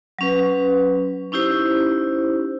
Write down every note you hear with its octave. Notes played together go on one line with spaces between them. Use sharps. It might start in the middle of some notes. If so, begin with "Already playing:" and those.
F#3 C#4 B4
C#4 D#4 E4 G4 C5